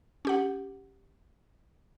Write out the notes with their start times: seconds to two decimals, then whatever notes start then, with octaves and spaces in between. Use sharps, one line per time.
0.25 C#4 G4 F#5